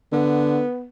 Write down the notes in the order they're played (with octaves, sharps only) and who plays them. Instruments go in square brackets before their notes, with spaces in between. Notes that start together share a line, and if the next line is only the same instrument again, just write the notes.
[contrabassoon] D3 [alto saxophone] B3